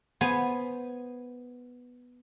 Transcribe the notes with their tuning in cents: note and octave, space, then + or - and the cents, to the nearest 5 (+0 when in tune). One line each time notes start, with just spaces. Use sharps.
B3 +0 C5 +0 G#5 +0